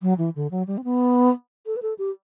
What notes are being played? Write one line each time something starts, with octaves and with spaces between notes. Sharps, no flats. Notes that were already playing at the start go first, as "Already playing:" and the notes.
F#3
E3
D3
F#3
G3
C4
B3
A4
B4
A4
G4